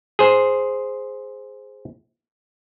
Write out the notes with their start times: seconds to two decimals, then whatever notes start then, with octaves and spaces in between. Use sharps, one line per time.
0.19 G#4 C5